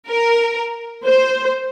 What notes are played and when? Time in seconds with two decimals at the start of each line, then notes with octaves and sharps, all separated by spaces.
0.08 A#4
1.04 C5